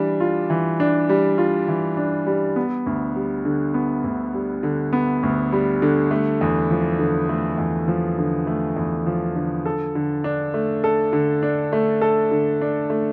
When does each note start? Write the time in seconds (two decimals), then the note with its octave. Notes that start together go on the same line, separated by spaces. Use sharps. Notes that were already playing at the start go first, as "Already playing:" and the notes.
Already playing: E3 G3 D4
0.20 F4
0.50 E3
0.80 D4
1.09 G3
1.38 F4
1.68 E3
1.97 D4
2.26 G3
2.56 B3
2.86 D2
3.16 G3
3.45 D3
3.74 B3
4.04 D2
4.34 G3
4.63 D3
4.93 B3
5.23 D2
5.53 G3
5.82 D3
6.11 A3
6.41 E2
6.71 F3
6.99 D3
7.29 A3
7.58 E2
7.88 F3
8.18 D3
8.47 A3
8.76 E2
9.06 F3
9.35 D3
9.66 A4
9.95 D3
10.24 D4
10.54 A3
10.84 A4
11.13 D3
11.43 D4
11.73 A3
12.01 A4
12.31 D3
12.61 D4
12.90 A3